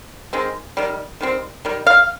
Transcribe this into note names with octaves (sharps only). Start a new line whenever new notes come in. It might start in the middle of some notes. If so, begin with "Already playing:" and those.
D#3 G#3 C4
D#3 G3
D#3 G3 C4
D#3 G3
F5